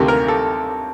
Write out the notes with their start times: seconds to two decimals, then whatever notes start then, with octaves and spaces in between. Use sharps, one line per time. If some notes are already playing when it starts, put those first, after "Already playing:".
Already playing: D2 C3 D#3 G4
0.08 A#4
0.28 A4